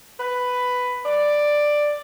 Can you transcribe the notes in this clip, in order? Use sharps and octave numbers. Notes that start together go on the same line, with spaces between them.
B4
D5